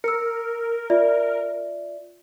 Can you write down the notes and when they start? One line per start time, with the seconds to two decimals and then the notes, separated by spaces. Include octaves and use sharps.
0.04 A#4 E6 C#7
0.90 F4 D5 E5